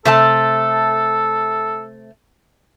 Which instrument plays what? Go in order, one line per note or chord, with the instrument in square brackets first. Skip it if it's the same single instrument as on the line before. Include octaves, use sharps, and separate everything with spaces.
[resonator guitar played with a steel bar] C3 A3 A5 [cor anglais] A4